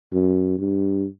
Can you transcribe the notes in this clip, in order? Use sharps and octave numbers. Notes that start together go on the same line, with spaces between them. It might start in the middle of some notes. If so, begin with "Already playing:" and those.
F#2
G2